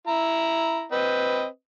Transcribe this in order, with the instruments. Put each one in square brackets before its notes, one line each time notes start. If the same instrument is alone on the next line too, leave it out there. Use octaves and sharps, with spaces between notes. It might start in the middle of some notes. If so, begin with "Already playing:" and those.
[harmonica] E4 A#5
C4 B4 D#5